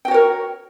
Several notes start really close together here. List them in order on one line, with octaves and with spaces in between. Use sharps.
G5 F#4 C#5 A#4